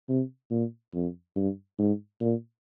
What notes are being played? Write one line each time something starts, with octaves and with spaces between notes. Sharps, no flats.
C3
A#2
F2
G2
G#2
A#2